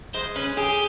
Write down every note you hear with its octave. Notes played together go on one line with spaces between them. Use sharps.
G#3 C5
C#4 B4
G4 G#4